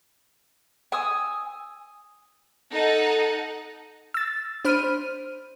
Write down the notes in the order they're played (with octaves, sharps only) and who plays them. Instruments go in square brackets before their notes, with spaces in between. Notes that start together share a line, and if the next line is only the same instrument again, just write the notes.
[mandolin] G#5 D#6 E6
[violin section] D#4 A4 F#5
[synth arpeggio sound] E6 A6
D4 C5 B5 F6 D#7